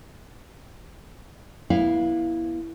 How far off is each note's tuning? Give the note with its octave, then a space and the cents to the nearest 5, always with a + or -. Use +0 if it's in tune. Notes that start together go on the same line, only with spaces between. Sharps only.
B3 -35 E4 +0 F5 +0